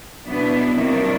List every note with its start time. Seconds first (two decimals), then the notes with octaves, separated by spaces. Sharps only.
0.25 B2 F#3 B3 D4 E4
0.76 C3 D#3 F#3 A#3 D4